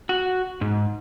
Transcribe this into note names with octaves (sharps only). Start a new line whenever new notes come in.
F#4
G#2